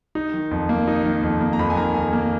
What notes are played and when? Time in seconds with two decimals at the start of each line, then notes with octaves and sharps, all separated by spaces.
0.15 D#4
0.33 D#3
0.51 F2
0.69 A#3
0.88 D#4
1.05 D#3
1.23 F2
1.41 A#3
1.53 A#5
1.59 F2 B5
1.70 G#5
1.77 D#3 A#5
1.94 F2 G#5
2.13 A#3